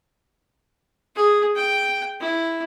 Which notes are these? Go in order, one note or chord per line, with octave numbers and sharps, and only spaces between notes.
G#4
G5
E4